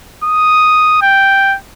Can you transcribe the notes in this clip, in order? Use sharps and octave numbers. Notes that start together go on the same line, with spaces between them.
D#6
G5